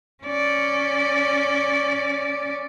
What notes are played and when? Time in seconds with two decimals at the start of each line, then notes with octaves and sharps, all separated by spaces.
0.24 C#4 D5